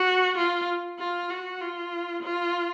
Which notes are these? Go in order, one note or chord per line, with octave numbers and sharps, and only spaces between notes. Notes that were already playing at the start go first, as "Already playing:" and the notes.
Already playing: F#4
F4
F4
F#4
F4
F4